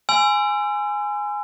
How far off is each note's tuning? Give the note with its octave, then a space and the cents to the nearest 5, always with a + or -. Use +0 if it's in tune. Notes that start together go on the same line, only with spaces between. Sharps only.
G#5 +0 C6 -40 E6 +35